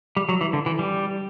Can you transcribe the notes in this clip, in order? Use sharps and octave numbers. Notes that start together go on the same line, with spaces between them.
G3
F#3
E3
D3
E3
G3